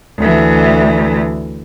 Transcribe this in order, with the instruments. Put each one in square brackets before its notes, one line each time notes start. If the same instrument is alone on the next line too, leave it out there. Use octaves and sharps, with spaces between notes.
[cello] D2 E3